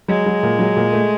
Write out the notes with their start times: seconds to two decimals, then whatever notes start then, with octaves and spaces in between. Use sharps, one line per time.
0.08 F#3 G#3
0.26 F#3
0.43 A#2
0.59 F#3
0.76 A#2
0.93 A3